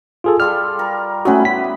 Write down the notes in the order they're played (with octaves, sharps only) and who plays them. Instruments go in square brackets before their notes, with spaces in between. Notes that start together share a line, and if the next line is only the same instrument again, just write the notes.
[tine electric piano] F4 G#4 A4
[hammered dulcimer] G3 F4 A4 [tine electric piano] F6
[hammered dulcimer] A#4
[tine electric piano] A3 C#4 F#4 [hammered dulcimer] B3 E4 B4
[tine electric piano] B6